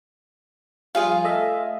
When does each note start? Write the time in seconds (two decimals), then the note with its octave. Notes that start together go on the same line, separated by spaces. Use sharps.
0.95 F3 G3 F4 G#4 F5
1.24 A3 D#5 E5